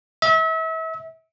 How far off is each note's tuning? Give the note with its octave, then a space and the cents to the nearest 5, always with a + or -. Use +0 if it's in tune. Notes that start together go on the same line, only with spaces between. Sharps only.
E5 -35